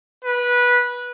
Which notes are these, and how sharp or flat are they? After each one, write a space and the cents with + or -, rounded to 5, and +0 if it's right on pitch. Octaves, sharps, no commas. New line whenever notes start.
B4 -15